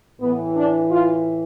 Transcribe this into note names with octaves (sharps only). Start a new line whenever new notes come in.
A2 E3 B3
D4
F4